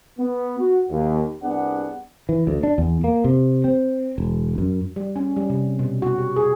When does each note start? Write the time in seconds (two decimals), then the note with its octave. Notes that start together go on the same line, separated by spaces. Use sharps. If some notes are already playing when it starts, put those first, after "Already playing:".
0.19 B3
0.59 F#4
0.89 D#2
1.43 C2 B3 D4 G#4 F#5
2.29 E3
2.47 D2
2.63 D4
2.78 E2
3.04 A#3
3.24 C3
3.64 C4
4.18 E1
4.58 F#2
4.96 G3
5.16 C#4
5.36 G3
5.50 C3
5.79 B2
6.02 F#4
6.18 G4
6.36 G#4